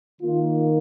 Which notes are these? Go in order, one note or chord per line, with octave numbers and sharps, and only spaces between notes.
D#3 A#3 F4